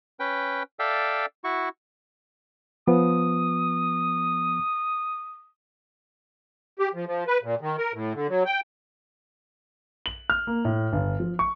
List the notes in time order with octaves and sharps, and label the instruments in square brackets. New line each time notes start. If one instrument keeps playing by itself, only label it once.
[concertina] C#4 B4 G5
A4 D5 E5 F5 G5
E4 F#4 C#6
[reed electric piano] F3 B3 [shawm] D#6
[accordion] G4
F3
F3
B4
A#2
D#3
A#4
A2
D3
F#3
G5
[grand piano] F#7
F6
A#3
A2
G1
F3
C#6